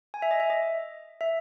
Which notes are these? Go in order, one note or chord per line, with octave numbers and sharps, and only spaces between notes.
G#5
E5
D#5
E5
D#5
E5